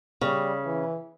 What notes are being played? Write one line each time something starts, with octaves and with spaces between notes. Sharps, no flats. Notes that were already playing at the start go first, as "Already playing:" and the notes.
C#3 G3
E3